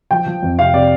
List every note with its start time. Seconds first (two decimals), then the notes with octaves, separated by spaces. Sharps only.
0.11 F3 G5
0.26 F3
0.43 F2
0.59 C3 F5
0.74 C3 D5